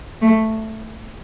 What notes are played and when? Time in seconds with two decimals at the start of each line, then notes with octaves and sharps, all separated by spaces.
0.22 A3